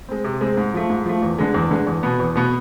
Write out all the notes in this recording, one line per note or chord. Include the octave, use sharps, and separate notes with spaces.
G#3 C4
C3
G#3 C4
G#2
F3 A3
G#2
F3 A3
E2
D3 G#3
E2
D3 G#3
E2
B2 B3
E2
B2 B3